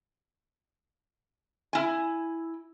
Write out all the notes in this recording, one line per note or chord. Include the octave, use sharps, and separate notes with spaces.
E4 G#5